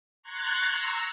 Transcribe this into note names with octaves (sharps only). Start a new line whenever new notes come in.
A#5 C6 C#6 F#6 G#6 A6
A#5 E6